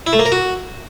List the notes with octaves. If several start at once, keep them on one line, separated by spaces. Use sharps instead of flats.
E4
A3
A#3
A#4
F#4